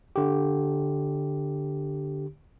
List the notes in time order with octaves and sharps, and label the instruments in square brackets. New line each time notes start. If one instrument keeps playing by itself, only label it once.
[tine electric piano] D3 G4